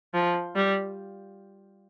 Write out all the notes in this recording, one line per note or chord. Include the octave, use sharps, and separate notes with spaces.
F3
G3